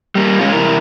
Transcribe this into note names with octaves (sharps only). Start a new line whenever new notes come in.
G3 A#3
G#3 A3 C#4 F4
E2 C3 E4 A#4